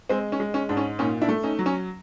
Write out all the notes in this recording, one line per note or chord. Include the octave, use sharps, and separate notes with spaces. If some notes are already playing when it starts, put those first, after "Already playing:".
G#3 C4
C#4
G#3
C#4
G#2 D4
C#4
A#2 C#4 D#4
D4 E4
A3
C#4 D#4
F#3
C#4